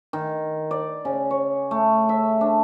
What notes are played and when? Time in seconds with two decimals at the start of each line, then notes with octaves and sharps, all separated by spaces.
0.13 D#3
0.71 D5
1.05 C#3
1.31 C#5
1.71 A3
2.09 E5
2.41 D4